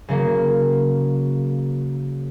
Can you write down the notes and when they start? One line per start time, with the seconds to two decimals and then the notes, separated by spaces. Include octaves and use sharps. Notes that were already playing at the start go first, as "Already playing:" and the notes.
0.09 C#3 F#3 A#3